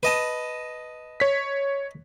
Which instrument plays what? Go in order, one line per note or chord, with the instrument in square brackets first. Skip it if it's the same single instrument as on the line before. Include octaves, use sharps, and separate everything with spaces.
[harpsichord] B4 D#5 A5
[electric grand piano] C#5 B6